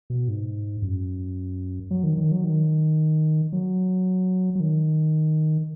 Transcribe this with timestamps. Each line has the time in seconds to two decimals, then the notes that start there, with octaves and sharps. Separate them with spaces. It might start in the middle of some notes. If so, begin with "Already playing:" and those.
0.10 B2
0.28 G#2
0.82 F#2
1.91 F#3
2.04 D#3
2.18 D#3
2.31 F#3
2.44 D#3
3.53 F#3
4.55 F#3
4.60 D#3